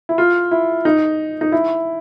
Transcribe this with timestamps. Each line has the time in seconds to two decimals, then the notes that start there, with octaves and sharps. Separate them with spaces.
0.09 E4
0.18 F4
0.51 E4
0.85 D#4
1.41 D#4
1.52 E4